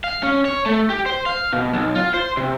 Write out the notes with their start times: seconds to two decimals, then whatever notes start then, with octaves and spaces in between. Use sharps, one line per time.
0.04 F5
0.23 C#4
0.45 C#5
0.66 A3
0.90 G4
1.06 C5
1.26 F5
1.53 B2
1.74 B1
1.95 F4
2.14 C5
2.37 C3